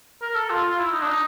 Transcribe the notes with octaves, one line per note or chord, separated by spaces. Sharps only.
A#4
A4
F4
F4
E4
D#4
D4
D#4